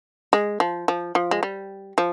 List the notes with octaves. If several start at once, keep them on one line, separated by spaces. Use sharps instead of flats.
G#3
F3
F3
F3
G#3
G3
F3